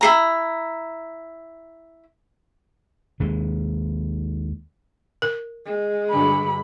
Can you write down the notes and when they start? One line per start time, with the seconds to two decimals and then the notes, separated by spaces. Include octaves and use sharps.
0.01 E4 G#4 A#5
3.20 D#2 G#3
5.22 A#4
5.65 G#3
6.10 G2 D3 F#3 B5